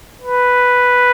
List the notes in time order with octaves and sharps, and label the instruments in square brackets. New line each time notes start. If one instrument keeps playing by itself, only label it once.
[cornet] B4